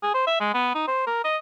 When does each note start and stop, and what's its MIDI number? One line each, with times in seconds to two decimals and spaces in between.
0.02 0.10 68
0.14 0.23 72
0.27 0.35 76
0.40 0.51 56
0.54 0.70 59
0.75 0.86 63
0.87 1.05 72
1.07 1.19 70
1.24 1.37 75